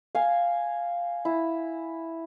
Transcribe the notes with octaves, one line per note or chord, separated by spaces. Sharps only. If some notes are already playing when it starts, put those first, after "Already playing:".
F5 G#5
E4